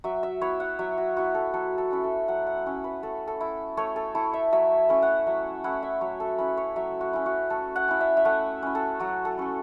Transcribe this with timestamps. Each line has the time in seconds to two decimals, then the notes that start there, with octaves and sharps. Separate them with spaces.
0.04 F#3 E5
0.23 E5
0.41 B3 E4 C#5
0.60 F#5
0.79 F#3 E5
0.98 F#4
1.16 B3 E4 F#4
1.35 A4
1.54 F#3 A4
1.78 A4
1.91 C#4 E4
2.04 A4
2.28 F#3 F#5
2.47 F#5
2.66 C#4 E4
2.84 B4
3.03 A3 A4
3.28 A4
3.41 E4
3.77 A3 C#5
3.96 A4
4.15 E4 A4
4.34 E5
4.52 F#3 E5
4.89 A3 C#4 E4
5.02 F#5
5.27 F#3 E5
5.64 A3 C#4 E4 F#5
5.83 E5
6.01 F#3 C#5
6.20 A4
6.38 C#4 E4 B4
6.57 C#5
6.76 F#3 E5
7.01 F#4
7.13 C#4 E4
7.26 F#4
7.50 A3 A4
7.76 F#5
7.88 C#4 E4
8.01 E5
8.17 E5
8.25 A3 F#5
8.63 C#4 E4
8.75 A4
9.00 F#3 F#4
9.25 A4
9.38 A3 C#4 E4